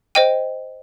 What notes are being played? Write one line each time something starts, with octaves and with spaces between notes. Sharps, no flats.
C5 D#5 G5 D#7